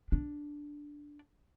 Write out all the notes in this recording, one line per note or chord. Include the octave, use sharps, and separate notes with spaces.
D4